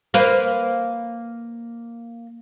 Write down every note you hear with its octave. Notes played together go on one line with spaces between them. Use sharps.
A#3 B4 C5